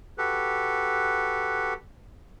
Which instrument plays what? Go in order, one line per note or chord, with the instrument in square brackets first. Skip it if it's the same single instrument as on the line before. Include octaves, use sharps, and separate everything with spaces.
[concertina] F#4 G4 A4 B4